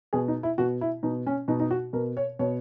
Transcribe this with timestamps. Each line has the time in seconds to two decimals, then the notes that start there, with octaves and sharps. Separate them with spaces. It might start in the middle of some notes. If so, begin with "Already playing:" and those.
0.13 B2 G#4
0.28 D#4
0.43 E4
0.58 B2 F#4
0.81 E4
1.03 B2 D#4
1.27 C#4
1.48 B2 D#4
1.60 D#4
1.71 F#4
1.93 B2 A#4
2.17 C#5
2.39 B2 C#5